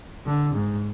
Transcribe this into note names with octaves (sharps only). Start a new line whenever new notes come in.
D3
G#2